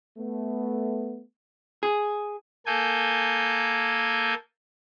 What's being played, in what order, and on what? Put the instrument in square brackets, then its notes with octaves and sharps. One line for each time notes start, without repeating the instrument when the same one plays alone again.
[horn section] A3 B3
[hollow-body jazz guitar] G#4
[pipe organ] A#3 A4 G#5 G6